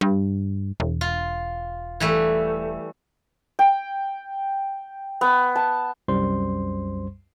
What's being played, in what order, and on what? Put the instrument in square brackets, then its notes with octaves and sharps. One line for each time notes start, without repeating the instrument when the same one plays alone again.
[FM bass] G2
E1
[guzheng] F4
E3 G3 A3
[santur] G5
B3
A5
[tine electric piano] C2 F#2 G3 C5 C6